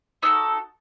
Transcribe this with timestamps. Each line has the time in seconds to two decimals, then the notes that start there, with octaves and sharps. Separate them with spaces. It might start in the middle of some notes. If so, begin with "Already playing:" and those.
0.22 D#4 F#4 A4 E6